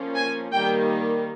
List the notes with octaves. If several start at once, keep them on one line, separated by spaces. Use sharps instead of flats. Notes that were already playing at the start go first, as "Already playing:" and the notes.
Already playing: F3 A#3 C#4
G#5
D#3 G3 A#3 G5